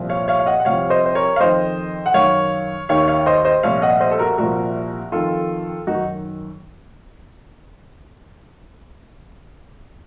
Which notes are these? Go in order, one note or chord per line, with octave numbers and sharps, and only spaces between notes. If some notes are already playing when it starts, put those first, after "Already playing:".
Already playing: C2 A#2 F3
C#5 F5
C#5 F5
F5
D#5 F#5
F#5
C2 C3 F3 C#5 F5
C5 D#5
C5
A#4 C#5
F5
F2 D#3 C5 D#5
F#5
F#2 D#3 C#5 F5
D#2 D#3 C#5 F5
C#5 F5
C5 D#5
C5 D#5
C2 A#2 F3 C#5 F5
D#5 F#5
C5 D#5
A4
F#4 A#4
C2 A#2 F3 F#4 A#4
F2 D#3 F4 A4
F#2 D#3 D#4 F#4